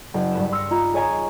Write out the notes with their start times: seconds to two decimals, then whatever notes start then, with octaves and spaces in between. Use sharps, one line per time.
0.14 F#1
0.32 G2 B4 E7
0.52 C6 E6 F6 A#6 C#7
0.71 D#4 F4 A#5 B5
0.94 G#4 C#5 D#5 G#5 A#5